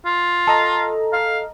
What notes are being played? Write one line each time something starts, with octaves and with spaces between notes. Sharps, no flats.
F4
A4 D#5 A#5
F5